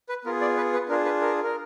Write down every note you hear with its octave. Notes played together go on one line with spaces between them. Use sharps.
B4
B3 F4 G#4 A#4
D5
B4
B4
D4 F4 G#4 A#4
B4
A#4
A#4